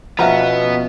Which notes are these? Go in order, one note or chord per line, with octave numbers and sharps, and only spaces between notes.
B2 F3 B3 C#4 E5 F#5 A#5